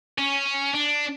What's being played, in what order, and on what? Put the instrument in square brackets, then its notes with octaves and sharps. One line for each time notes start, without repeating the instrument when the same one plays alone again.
[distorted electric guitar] C#4
D4